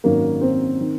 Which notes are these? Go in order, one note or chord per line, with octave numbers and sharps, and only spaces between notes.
G#1 F#2 D#3 F#3 A#3
C4
D#3